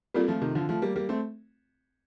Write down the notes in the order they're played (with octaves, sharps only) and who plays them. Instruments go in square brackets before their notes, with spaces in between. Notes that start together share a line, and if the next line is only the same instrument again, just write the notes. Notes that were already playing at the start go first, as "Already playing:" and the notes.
[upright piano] G3 A#3 [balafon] C4 F4 A4 D5
[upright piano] F3 A3
C3 D#3
D3 F3
F3 A3
G3 A#3
G3 A#3
A3 C4